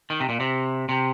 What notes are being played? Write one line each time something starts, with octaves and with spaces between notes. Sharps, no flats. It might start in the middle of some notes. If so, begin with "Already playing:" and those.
D#3
C3
A#2
C3
C3